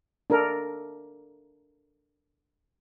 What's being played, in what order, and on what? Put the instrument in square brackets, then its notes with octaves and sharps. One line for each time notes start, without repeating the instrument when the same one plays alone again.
[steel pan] D4 A4 A#4